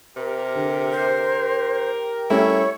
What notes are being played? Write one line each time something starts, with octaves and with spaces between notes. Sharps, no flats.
C3 G4 A#4
D3
C5
G3 A3 C#4 E4 C#5